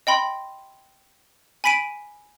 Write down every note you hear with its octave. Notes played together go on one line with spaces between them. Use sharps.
D#5 G5 B5 C6
G#5 B5 B6 D7 D#7